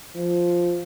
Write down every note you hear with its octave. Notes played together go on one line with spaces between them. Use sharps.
F3